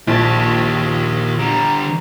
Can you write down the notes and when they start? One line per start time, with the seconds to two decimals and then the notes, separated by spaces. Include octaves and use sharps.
0.07 A#1 D#2 A5
1.39 D3 G3 A#5